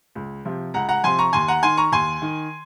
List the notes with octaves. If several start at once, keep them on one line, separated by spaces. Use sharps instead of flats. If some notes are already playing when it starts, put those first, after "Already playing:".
C#2
C3 F3
C#2 F#5 A#5
F#5 A#5
C3 F3 G#5 C6
A#5 C#6
D#2 G#5 C6
F#5 A#5
D#3 G#5 C6
A#5 C#6
D#2 G#5 C6
D#3